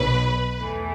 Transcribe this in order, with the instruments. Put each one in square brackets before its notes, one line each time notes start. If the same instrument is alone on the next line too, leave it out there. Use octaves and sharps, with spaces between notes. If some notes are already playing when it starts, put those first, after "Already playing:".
Already playing: [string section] B1 B2 F#3 B4
E2 E3 A3